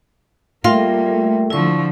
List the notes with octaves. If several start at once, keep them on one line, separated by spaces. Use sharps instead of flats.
G3 A3 A#3 F4 A#4 E5 G5
D3 F3 E4 C#6